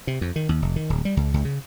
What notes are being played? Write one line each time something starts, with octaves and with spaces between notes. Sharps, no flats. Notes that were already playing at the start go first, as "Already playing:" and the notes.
C3
F2
D#3
D#2
F1
D#3
D1
G3
C#2
C#2
C#3